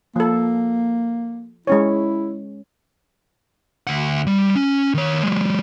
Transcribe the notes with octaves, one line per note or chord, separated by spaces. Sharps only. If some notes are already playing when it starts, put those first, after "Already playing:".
F3 A#3 A4
G#3 C#4 E4 C#5
D2 F#5
G3
C#4
D#3 C#5
F#3 G#3